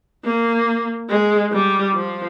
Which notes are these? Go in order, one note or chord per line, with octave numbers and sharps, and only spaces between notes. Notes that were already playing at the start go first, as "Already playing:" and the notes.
A#3
G#3
G3
F3